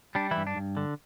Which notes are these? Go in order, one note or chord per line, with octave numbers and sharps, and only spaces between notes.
G3 D4
E3 E4
G2
D4
G2
D3